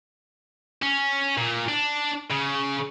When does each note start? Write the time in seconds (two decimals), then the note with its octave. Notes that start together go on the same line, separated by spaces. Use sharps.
0.82 C#4
1.38 A#2
1.69 D4
2.30 C#3